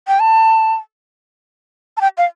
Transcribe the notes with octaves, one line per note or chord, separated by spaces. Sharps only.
G5
A5
A5
G5
F5